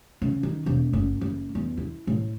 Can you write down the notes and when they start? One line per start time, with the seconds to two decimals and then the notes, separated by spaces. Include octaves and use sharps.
0.22 C#3
0.43 D#3
0.66 E1
0.93 F#1
1.21 F#1
1.55 E2
1.77 E4
2.07 A2